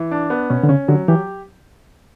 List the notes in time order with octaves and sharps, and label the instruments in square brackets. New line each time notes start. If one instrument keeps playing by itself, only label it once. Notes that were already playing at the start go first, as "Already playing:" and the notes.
Already playing: [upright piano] E3
D4
B3
[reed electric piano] B2 [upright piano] C#4
[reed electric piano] D3
[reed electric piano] C#3 [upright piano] C#4
[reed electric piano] D3 [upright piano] F#3
[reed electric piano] E3 [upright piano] G4